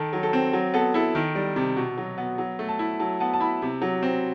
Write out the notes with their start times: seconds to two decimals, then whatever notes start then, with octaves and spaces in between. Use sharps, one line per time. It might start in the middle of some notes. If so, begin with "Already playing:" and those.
Already playing: D#3 A4
0.13 F#3
0.23 A4
0.33 C4
0.53 F#3
0.74 B3 A4
0.94 E4 A4
1.15 D#3
1.35 G3
1.56 C3
1.77 B2
1.98 F#3
2.18 B3
2.38 F#3
2.59 A3
2.69 A5
2.79 E4
2.99 F#3 A5
3.20 B3 A5
3.33 A5
3.40 E4 B5
3.62 C3
3.82 F#3
4.03 C4